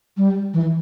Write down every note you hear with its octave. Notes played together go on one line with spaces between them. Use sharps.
G3
E3